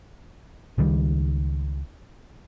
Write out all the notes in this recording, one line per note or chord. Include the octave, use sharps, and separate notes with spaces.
C#2 D#3 G3